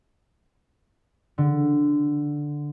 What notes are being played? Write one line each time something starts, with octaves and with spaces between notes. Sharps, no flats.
D3